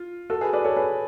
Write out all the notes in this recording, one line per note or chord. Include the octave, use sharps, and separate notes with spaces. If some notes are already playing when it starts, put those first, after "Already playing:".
Already playing: F4
F#4 A4
G#4 B4
B4 D5
A4 C#5
G#4 B4